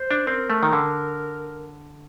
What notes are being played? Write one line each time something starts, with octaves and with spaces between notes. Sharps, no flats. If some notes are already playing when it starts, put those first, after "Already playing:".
Already playing: C5
D4
C4 A#4
A3
D#3
D3